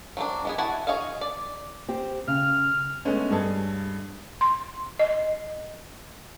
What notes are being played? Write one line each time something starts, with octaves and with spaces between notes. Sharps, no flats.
F#3 C4 D4
G#3 B3 G#4
E4 F#4 F#5 G#5 A5
F#4 G#4 C#5 D#5 F5
D5
C4 G4
C#3 F6
G#3 A3 B3 C#4
G2 G#4 A4
C6
D#5